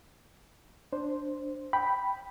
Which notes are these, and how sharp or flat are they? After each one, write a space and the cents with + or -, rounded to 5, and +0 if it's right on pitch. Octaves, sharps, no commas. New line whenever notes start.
D4 +0 C5 +0
G5 +0 B5 +0